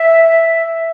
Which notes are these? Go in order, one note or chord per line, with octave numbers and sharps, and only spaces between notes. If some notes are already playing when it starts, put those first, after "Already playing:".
Already playing: E5